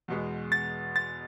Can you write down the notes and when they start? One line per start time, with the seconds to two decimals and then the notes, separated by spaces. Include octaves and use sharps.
0.08 E2 B2 G#3
0.52 A6
0.96 A6